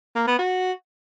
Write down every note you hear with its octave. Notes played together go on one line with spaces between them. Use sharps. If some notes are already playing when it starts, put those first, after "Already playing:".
A#3
B3
F#4